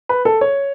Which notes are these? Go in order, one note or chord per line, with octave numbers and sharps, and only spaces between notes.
B4
A4
C#5